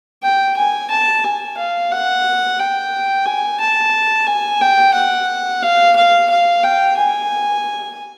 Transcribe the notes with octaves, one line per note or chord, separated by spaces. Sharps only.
G5
G#5
A5
G#5
F5
F#5
G5
G#5
A5
G#5
G5
F#5
F5
F5
F5
G5
G#5